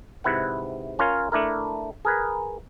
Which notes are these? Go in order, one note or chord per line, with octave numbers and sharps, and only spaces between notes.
G#2 C3 E4 B4 F#5
C#4 F4 A#4 C#5 F5
A3 D4 E4 A#4
G#4 A#4 B4